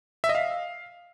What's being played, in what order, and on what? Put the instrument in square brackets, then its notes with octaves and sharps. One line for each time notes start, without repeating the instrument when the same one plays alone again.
[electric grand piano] E5
D#5
F5